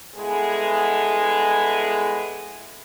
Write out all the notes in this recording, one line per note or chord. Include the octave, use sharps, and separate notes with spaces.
G2 G#3 B3 E4 G#4 A4